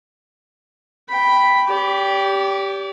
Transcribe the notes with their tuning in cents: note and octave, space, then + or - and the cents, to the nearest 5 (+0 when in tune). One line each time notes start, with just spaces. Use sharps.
G5 +0 B5 +0
G4 +0 D5 -40